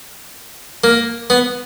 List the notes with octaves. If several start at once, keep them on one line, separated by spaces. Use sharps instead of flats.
A#3
B3